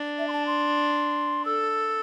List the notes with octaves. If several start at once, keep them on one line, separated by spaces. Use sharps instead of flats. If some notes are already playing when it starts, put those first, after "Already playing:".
Already playing: D4
E5
C6
A5
C6
A4 E6